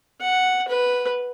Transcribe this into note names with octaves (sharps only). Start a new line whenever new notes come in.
F#5
B4